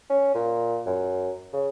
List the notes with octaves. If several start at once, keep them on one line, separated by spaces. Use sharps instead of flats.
C#4
A#2
F#2
C#3